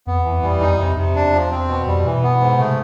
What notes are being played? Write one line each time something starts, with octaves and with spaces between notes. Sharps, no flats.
F2 B3
E2
E3
F2
F2 G3
F2 D#4
F2 C3
F2 C3
E2 D4
F3
C4
B2
F2 G3
B2 E3
B3
G#2
C3 A3